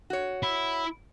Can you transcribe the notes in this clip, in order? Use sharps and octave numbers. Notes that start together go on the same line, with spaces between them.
F#4 C#5
E4